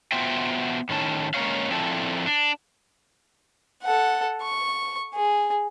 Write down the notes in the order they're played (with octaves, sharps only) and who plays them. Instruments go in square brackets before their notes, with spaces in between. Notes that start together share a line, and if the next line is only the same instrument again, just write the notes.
[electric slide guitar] B3 F4 F#4 C5 E5 G5
A2 D#3 C#4 A5
G#3 A#3 C#4 C#5 F5
F3 C4 D4 E4 A4
D4
[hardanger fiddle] A4 F#5
C#6
G#4